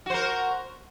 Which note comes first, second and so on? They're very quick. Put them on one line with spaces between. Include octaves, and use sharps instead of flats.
F#4 C5 A#4